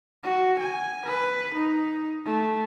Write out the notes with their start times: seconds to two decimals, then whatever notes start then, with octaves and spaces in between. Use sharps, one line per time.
0.23 F#4
0.59 G#5
1.06 B4
1.54 D#4
2.25 A3